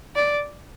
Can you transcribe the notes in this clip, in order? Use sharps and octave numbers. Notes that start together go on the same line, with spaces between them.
D5